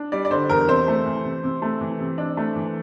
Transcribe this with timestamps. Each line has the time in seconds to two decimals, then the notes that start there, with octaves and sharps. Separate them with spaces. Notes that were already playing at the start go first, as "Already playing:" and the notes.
Already playing: D4
0.12 G3 D5
0.25 D5
0.31 D3 C5
0.49 E2 A#4
0.68 C3 C5
0.88 A3
1.06 E3
1.25 C3
1.44 C3
1.62 A3
1.81 E3
2.00 C3
2.18 D4
2.37 A3
2.56 E3